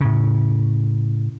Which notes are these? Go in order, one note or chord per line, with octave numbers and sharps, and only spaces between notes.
A2 C#3